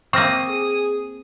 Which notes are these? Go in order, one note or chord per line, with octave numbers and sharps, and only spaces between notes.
A#3 C4 C#6 D#6 F6 A#6
G#4